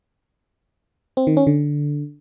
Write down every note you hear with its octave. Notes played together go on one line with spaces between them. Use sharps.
C4
D#3
C#4
D3